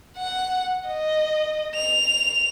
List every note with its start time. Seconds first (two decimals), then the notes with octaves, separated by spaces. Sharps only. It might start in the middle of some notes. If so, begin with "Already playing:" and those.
0.17 F#5
0.87 D#5
1.75 F7